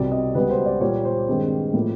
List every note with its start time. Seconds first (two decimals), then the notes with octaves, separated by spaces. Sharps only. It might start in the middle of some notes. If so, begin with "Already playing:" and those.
Already playing: C2 B2 G3 C4 D5
0.12 D#5
0.35 C#2 B2 G3 B3 B4
0.51 C5
0.66 D5
0.81 A#2 G3 A#3 C#5
1.05 C5
1.28 G2 D#3 G#3 C4
1.74 A2 F3 A#3